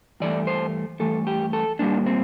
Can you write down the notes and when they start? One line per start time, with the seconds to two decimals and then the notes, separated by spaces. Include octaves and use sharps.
0.20 G2 E3 A3 D5
0.47 C5
0.99 G2 E3 A3 A4
1.27 G4
1.53 A4
1.79 A#2 G3 A#3 D4
2.06 C4